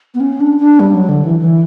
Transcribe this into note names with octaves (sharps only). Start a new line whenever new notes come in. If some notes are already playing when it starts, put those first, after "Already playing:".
B3
C#4
D4
D4
G3
F#3
D3
E3
E3